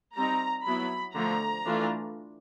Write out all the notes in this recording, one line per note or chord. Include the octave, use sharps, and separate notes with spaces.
G3 C4 D#4 A#5
F#3 B3 E4 B5
D3 F3 A3 A#5
E3 A3 D4 F4